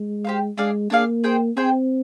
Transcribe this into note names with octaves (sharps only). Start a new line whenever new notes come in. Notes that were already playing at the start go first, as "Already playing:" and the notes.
Already playing: G#3
G4 C5 F5
G#3 D4 G#4 D5 F5
A#3 D4 G#4 D5 F5
G#4 C5 G5
C4 G#4 C5 G5